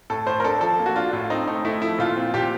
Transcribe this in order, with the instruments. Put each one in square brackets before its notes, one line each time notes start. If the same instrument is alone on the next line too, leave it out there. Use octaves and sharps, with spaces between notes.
[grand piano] A2 A4
A2 C5
A#4
D4 A4
F3 A4
A#3
F#4
D4 F4
A2
C4 D#4
A3 D#4
A3 E4
F3 E4
A#2 F4
C4
A#2 G4